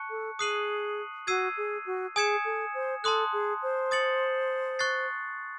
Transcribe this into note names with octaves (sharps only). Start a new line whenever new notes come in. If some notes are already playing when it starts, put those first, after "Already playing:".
Already playing: A5 C#6 F#6 C#7
A4
G#4 D#6 F#6 C7 D#7 F#7
F#4 E6 G#6 C7 D#7
G#4
F#4
G#4 G#5 D#6 G#6 C#7 E7
A4
C5
A4 A5 C6 D#6 F#6
G#4
C5
D#6 A6 C#7 F#7
C#6 F#6 A6 C7